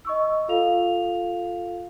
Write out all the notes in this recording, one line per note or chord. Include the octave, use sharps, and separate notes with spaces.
D#5 C#6 E6
F4 A4 F5 F7